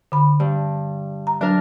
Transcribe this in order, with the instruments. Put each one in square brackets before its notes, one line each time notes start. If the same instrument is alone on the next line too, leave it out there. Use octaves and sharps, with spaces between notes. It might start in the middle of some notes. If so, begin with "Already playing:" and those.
[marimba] D3 B5
[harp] G2
[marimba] A#5
[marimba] F#3 [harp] D4 A#4